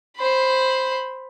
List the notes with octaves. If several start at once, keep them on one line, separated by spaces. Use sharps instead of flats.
C5 B5